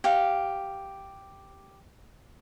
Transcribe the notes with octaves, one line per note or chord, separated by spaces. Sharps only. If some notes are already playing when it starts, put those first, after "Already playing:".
G4 F5